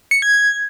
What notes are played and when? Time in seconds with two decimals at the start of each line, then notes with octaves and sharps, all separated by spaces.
0.11 C#7
0.22 G#6
0.33 G#6